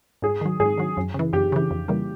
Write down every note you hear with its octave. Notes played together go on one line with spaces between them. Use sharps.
G#2 G#4
D#3 F#3
G#2 G#4
D#3 F#3
F#2
C#3 E3
F#2 G4
C#3 E3
F2
C#3 E3 G3 A#3